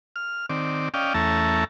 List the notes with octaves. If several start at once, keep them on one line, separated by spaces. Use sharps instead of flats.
F6
D#3 C4 D5
C#4 D5 D#5 F5 G5
E2 A3 C#4 E5 A5 A#5